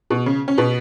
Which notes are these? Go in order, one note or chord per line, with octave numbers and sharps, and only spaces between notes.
B2
C#3
C#4
B2 B3